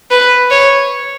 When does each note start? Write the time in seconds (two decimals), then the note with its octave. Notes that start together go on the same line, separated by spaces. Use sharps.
0.11 B4
0.51 C#5